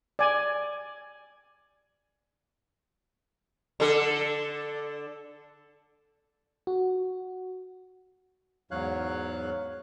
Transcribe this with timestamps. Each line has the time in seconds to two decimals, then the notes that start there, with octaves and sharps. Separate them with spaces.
0.19 D5 G#5
3.80 D3 A4
6.67 F#4
8.71 E2 G#2 F#3 C#5 F5 F#6